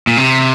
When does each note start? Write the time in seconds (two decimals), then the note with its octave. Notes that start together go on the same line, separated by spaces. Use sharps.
0.07 A#2
0.17 C3